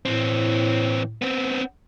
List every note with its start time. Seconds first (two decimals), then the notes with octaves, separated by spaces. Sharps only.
0.05 A2 E3 C4
1.22 B3 C4